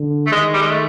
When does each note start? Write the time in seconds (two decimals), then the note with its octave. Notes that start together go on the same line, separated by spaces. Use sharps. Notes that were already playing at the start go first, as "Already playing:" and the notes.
Already playing: D3
0.27 A3
0.32 D#3 G#3
0.54 G3
0.62 G#3
0.70 A3